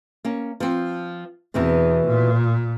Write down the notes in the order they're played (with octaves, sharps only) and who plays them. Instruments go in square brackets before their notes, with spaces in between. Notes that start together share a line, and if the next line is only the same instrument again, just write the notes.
[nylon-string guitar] A#3 C#4
F3 C4
[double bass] E2 [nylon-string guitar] B2 E3 C4
[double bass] A#2